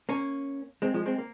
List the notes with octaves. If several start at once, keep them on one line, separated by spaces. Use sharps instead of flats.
A#3 C#4
G#3 C4
F3 G#3
G#3 C4
A#3